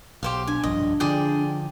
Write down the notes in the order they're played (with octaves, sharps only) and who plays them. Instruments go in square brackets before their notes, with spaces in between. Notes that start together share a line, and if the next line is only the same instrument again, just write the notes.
[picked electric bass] B1 [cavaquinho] G4 C5 F5
[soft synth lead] D4 [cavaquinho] G#5
[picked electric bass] F1 A#1 G2 [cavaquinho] D#5
[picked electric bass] D3 F3 [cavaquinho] G#4 D5 G5